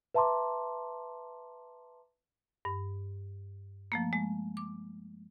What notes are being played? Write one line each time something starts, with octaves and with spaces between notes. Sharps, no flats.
B4 E5 A5 A#5 C6 D6
G2
F3 A3 A#3
G#3
D6